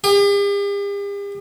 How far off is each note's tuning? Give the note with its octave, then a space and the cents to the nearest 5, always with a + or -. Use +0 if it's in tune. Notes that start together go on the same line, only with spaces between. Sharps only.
G4 +45